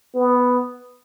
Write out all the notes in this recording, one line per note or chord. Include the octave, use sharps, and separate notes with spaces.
B3